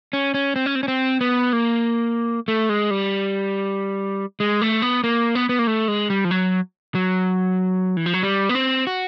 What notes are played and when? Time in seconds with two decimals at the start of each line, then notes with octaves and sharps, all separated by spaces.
0.13 C#4
0.34 C#4
0.56 C4
0.66 C#4
0.75 C4
0.83 C#4
0.88 C4
1.21 B3
1.53 A#3
2.48 A3
2.69 G#3
2.91 G3
4.40 G#3
4.61 A3
4.82 B3
5.04 A#3
5.35 B3
5.49 B3
5.59 A#3
5.67 A3
5.88 G#3
6.10 G3
6.25 F3
6.31 F#3
6.95 F#3
7.97 E3
8.06 F3
8.14 F#3
8.23 G3
8.49 B3
8.55 C4
8.87 F#4